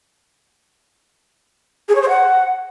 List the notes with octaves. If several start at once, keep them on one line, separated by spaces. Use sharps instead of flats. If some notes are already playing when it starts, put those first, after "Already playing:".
G#4
C#5
C5
F#5